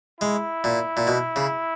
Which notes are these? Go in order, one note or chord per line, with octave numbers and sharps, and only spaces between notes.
G#3 E4
A#2
A#2
B2
C#3